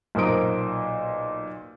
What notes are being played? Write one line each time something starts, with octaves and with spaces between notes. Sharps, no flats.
B1 A#2 A#4 C5 D#6 D7